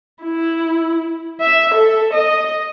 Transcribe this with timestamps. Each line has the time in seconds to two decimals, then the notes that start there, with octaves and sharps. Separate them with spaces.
0.24 E4
1.41 E5
1.75 A4
2.14 D#5